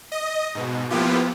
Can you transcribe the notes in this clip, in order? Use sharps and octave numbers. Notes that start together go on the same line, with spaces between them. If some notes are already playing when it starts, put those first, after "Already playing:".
D#5
G#2 B2
F3 A#3 B3 E4 F4 G4